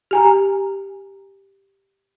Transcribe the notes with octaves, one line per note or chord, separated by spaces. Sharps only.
G4 G#5 A#5